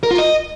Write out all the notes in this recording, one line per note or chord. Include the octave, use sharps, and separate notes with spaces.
A#4
F4
D#5